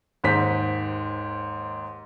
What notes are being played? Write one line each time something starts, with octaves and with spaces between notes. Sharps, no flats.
D#2 G#2 D#4 C5 B6